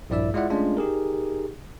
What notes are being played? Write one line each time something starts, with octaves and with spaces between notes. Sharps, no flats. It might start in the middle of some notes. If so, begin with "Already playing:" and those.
A#1 G2 E4 D5 E5 E6
G#3 E4 F4 D5 E5 F#5
G#3 A3 C#4 D4 F4
D#4 G4 G#4 A#4